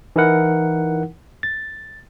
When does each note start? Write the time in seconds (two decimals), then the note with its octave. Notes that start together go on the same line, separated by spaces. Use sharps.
0.16 E3 D#4 E4 A#4 F#5
1.43 A6